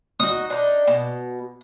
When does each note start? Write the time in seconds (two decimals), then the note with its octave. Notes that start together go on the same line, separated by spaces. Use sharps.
0.20 D#4 F#4 D#6
0.50 D4 D#4
0.87 B2